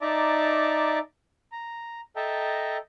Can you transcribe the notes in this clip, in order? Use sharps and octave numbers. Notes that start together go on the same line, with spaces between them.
D#4 D5 E5 A5 A#5 D6
A#5
A4 D#5 E5 G5 A5 A#5